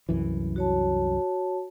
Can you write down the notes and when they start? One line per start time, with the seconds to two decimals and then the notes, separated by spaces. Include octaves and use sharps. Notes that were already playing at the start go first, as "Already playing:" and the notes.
0.09 C2 F#2 E3
0.56 F#4 C#5 A5